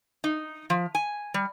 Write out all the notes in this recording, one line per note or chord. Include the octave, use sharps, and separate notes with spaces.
D#4
F3
G#5
G3